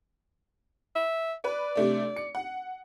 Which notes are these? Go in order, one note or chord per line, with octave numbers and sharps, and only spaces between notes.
E5
B4 D5
C3 A3 D4
C#7
F#5